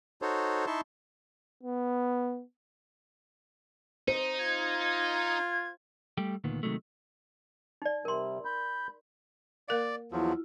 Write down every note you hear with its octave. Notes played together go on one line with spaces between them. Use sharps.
D#4 F#4 A4 C5 C#5
D#4 E4 A5 C6 C#6
B3
D#4 C5
F4 G#6
G3 A3 G4
D2 A#2 D#3 B3
C3 D#3 F#3 G#3 A3
D#4 D5
C3 G3 A#4 C6
B5 G6
A#3 A#4 D5 F5
E2 F3 F#3 E4 F4